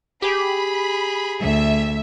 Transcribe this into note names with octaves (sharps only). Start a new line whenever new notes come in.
G4 G#4 B5
D2 E5